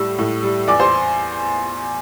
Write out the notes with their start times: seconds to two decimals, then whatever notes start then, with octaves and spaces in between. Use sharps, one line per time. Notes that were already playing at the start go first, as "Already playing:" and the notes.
Already playing: A2 G3 E6
0.18 A2
0.43 G3
0.68 E2 D5 D6
0.80 C5 C6